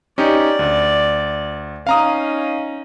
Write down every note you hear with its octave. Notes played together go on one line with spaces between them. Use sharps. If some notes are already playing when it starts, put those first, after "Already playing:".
C#4 D#4 G4 D5
D2
C#4 D#4 F5 A#5 D#6